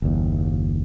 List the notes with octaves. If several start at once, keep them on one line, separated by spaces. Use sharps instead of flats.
F#1 D#2